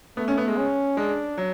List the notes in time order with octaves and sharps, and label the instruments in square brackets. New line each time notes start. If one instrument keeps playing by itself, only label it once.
[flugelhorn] A3 [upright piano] B3
[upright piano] C#4
B3
G#3
[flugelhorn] C#4
[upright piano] G#3 [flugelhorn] D4
[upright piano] F#3